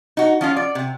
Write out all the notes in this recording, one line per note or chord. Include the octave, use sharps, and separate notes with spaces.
D#4 F#4
F3 C#4 F4
D5
C3